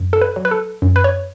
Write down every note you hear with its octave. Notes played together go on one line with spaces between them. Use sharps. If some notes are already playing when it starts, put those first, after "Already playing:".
Already playing: F#2
A4
B4
F#3
B4
A4
F#2
B4
C#5